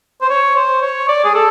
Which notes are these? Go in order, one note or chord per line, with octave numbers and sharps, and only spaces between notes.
C5
C#5
C5
C#5
D5
G#4
A4